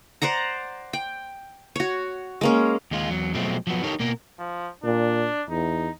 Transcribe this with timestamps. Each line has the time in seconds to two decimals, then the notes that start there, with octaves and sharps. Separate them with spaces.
0.22 C5 D5 F#5 A#5
0.93 G5
1.76 F#4 C#5
2.41 G#3 A#3 C#4
2.91 D#2 G#3 F4
3.09 E2 F#3
3.34 B2 F3 F#3 G#3 A3 C4
3.67 F3 F#3 B3
3.84 D#4 G4 A4 A#4 C#5
4.00 B2 A#3 A#4
4.39 F3
4.84 A#2 D4
5.50 E2 D#4